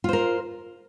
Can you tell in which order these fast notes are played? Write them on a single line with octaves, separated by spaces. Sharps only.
F4 C5 A#4